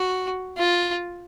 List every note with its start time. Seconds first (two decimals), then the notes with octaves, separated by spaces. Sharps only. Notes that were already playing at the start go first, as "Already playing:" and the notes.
Already playing: F#4
0.58 F4